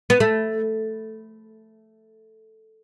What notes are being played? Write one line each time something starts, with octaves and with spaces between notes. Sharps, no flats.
B3
A3